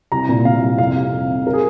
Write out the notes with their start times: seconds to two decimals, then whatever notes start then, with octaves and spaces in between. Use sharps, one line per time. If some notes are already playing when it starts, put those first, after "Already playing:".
0.12 C2 A#5
0.29 A#2
0.45 A#2 F5
0.62 C2
0.78 F2 F5
0.96 C3
1.12 F2
1.30 D#3
1.47 A#4
1.53 G#4